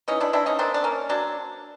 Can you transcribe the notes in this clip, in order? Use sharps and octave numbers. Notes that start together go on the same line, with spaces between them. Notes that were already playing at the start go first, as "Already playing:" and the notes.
E3 C#4 D#4
D4 E4
C4 D4 E4
C#4 D#4
A#3 C4 D4
D4
A#3 C#4
F#3 C4 D4